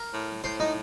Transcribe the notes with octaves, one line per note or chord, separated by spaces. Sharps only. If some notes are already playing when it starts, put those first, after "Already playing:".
Already playing: A#4
A2
A2 C5
D#4